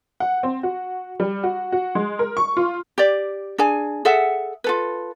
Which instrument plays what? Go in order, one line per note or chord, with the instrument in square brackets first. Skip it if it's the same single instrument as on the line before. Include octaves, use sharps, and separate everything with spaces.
[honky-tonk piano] F#5
C4
F#4
G3
F#4
F#4
G#3
A#4
C#6
F4
[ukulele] G4 D5
D4 G#4 G#5
G#4 A4 E5 F#5
F4 A4 B4